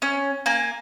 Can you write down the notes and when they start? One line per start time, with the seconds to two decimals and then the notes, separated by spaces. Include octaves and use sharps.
0.02 C#4
0.46 A#3 G#5